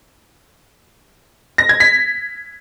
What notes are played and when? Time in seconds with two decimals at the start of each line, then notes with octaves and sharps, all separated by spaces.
1.58 A#6
1.69 G#6
1.80 B6